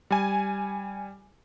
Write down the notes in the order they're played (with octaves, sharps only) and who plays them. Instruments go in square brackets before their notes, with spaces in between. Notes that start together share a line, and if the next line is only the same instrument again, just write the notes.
[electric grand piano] G3 G#5